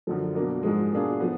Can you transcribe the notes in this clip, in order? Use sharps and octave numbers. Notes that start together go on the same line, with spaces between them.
F#2 D3 F3
B2 A#3 D4
G#2 F3 G#3
B2 A#3 D4 F4 G#4
F3 B3